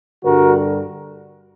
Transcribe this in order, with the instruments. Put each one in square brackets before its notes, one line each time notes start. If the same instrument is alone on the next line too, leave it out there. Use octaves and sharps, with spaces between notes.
[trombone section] G2 D3 G3 F#4 A#4